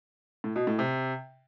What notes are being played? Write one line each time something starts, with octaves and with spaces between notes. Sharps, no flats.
A2
B2
A2
C3